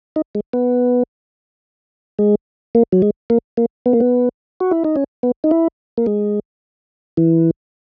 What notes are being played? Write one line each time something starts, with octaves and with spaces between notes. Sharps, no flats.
D#4
G#3
B3
G#3
A#3
F#3
G#3
A#3
A#3
B3
A#3
B3
F#4
E4
D#4
C#4
B3
D#4
E4
A#3
G#3
E3